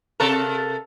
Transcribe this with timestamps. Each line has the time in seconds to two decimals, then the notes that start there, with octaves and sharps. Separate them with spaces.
0.20 C3 A4 A#4